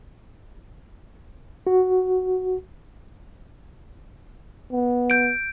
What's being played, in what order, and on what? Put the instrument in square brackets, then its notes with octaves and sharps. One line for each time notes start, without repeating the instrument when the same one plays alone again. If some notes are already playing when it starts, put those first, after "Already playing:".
[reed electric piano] F#4
[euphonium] B3
[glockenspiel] G6 D7